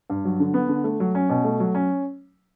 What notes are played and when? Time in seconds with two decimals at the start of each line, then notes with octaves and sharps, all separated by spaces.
0.10 G2
0.25 F#3
0.40 D3
0.54 B3
0.69 D3
0.84 A3
1.00 F#3
1.15 C#4
1.30 B2
1.44 A3
1.60 F#3
1.75 C#4